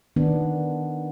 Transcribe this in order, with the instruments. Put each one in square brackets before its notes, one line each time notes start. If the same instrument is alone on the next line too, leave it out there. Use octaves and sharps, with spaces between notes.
[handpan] D#3 B3 D4